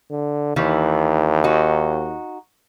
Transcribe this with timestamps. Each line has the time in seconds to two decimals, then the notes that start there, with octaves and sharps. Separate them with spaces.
0.11 D3
0.56 D#2 D#3 E3
1.44 D#4 F#4